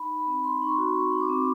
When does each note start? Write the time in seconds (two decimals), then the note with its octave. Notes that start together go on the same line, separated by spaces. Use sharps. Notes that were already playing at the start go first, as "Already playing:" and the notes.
Already playing: D#4 B5
0.10 D#4
0.19 B5
0.27 C4
0.44 D#4 C6
0.62 D#4 C#6
0.69 C6
0.78 F#4
0.95 C4 C#6
1.12 D#4
1.21 D6
1.29 C4
1.38 D6